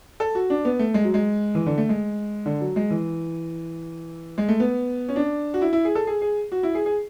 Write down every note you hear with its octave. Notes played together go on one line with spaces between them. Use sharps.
A4
F#4
D4
B3
A3
G#3
F#3
G#3
E3
D3
A3
G#3
D3
F#3
G#3
E3
G#3
A3
B3
C#4
D4
F#4
E4
E4
G#4
A4
G#4
G#4
F#4
E4
G#4
G#4